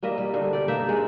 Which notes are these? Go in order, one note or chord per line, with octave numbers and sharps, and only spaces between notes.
G3 A#3 D#5 E5
G3
G2 D3
G4 D5
A#3 D#4 E5
G#3